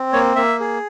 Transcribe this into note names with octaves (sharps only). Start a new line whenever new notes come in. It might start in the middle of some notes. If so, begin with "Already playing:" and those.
Already playing: C4
A#3 C#5
A#3 E5
G#4